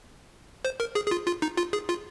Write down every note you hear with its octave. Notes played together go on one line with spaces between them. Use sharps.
C5
A#4
G#4
G#4
F4
F4
D#4
F4
G#4
F4